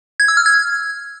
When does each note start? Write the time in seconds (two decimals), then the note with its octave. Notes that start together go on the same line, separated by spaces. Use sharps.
0.20 G#6
0.28 E6
0.37 F6
0.46 G#6